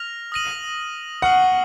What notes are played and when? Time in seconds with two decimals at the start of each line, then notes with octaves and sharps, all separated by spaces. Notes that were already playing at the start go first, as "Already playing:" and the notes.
Already playing: F6 A#6 F7
0.32 D#6 A#6 D#7 F#7
1.22 F#5 C#6 F6 C7 F#7